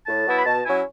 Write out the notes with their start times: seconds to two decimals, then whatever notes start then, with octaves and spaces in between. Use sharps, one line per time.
0.06 A2 A5
0.27 F#3 B3 E4
0.37 B5
0.45 B2 A5
0.65 F#3 C#4 E4 G#5